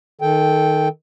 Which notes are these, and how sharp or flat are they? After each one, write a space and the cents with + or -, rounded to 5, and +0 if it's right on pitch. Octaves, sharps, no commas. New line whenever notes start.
D#3 +0 A4 -20 G5 +0